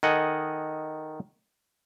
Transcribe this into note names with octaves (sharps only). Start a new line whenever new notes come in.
D#3 A4 D#5 F#5 G#5